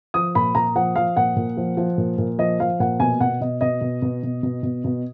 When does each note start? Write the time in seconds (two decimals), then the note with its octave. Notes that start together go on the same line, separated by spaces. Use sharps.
0.14 F3 D#6
0.35 A#2 B5
0.55 A#2 A#5
0.75 F3 F#5
0.96 F3 F5
1.17 A#2 F#5
1.36 A#2
1.57 F3
1.77 F3
1.98 A#2
2.18 A#2
2.38 F3 D#5
2.60 F3 F5
2.80 A#2 F#5
3.00 B2 G#5
3.20 B2 F#5
3.41 B2 D#5
3.61 B2 D#5
3.81 B2
4.02 B2
4.23 B2
4.43 B2
4.63 B2
4.84 B2